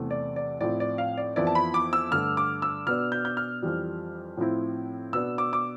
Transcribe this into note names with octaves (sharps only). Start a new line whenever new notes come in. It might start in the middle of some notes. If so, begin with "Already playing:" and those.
Already playing: E2 C3 E3 A3
D5
D5
A2 F3 C4 E4 D5
D5
F5
D5
F2 E3 B3 E4 D5
A5
B5
D6
E6
G2 D3 A3 F6
D6
E6
B2 B3 D4 F6
G6
G6
F6
F2 E3 G3
A2 F3 C4 E4
B2 B3 D4 E6
D6
D6